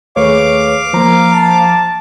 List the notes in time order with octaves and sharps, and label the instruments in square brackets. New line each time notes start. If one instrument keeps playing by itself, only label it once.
[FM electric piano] D#2 A3 C#6 [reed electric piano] G#4 B4 C#5 [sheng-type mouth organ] F5 D6
[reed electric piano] F3 A#5 [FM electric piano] A#3 C5
[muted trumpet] A5